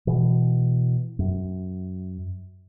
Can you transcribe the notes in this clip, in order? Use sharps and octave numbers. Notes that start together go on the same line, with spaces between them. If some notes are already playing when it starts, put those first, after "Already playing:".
B2 E3
F#2